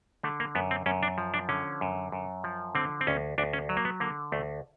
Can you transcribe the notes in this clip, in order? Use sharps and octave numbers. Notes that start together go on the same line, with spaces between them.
D3 A3
A#3
F#2 B3
C4
F#2 C#4
D4
F3
D4
D3 C#4
F#2
F#2
F3
D3 C4
C4
D2 C#4
D2 D4
C#4
F#3
A#3
B3
D3 A#3
D2 A3